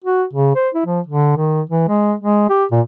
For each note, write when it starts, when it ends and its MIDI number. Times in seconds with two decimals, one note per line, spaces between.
0.04 0.24 66
0.33 0.54 49
0.55 0.69 72
0.74 0.85 64
0.86 1.00 53
1.07 1.35 50
1.37 1.61 51
1.70 1.85 52
1.88 2.14 56
2.20 2.44 56
2.49 2.65 67
2.72 2.81 46